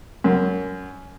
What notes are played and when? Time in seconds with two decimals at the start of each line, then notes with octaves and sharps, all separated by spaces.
0.24 F#2